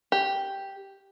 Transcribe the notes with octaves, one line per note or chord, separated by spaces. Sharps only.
G4